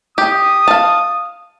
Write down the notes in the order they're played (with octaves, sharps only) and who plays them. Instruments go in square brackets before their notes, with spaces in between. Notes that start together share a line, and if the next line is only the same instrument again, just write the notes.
[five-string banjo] G4 [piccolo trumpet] D#6
[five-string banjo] F5 A5